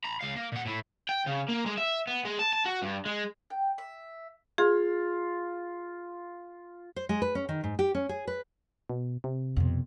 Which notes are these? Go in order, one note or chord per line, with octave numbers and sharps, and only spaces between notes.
A#5 B5
C#2 F5
A#3
A#2 F#5
A2 E4
G5
C#3
A#3
G#3
E5
B3
G#3
A5
A5
F#4
G2
G#3
G5
E5
F4 G#4
C5
G#3
B4
C#4
D#3
G#2
G4
C#4
G#4
B4
B2
C3
F2 B2